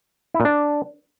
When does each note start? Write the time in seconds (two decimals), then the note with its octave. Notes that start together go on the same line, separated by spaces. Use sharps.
0.34 E4
0.40 A#2
0.45 D4